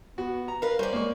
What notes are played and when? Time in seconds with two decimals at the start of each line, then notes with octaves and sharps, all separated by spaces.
0.18 B3 F#4
0.48 A#5
0.62 A#4 B4 F5
0.79 G3 C#4 C5 D5
0.93 G#3 A#3 C#6